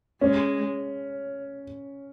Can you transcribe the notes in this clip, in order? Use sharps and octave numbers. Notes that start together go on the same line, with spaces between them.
G#3 C#4